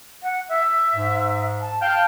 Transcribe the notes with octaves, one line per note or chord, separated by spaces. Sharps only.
F#5
E5
G#2
A5
F5 G5 A5